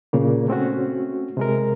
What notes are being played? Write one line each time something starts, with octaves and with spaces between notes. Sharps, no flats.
A#2 C#3 A#3
A3 C4 C#4 F#4
C3 G#3 A#4